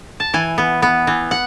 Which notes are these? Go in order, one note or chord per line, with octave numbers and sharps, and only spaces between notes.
A5
E3 G#5
B3
B3
E3
F#5